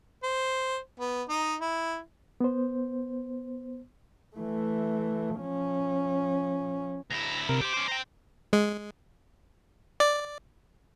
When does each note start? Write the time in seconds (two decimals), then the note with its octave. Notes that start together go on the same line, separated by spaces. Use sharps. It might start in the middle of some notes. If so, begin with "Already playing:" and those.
0.23 C5
1.00 B3
1.29 D#4 D#5
1.61 E4
2.41 B3 C5
4.36 E3 A3
5.37 F3 C#4
7.11 D2 E4 A#5
7.49 C3 A#4
7.61 G4 C5 D6
7.74 C#4 C5
7.88 C5 G5 A#5
8.53 G#3
10.00 D5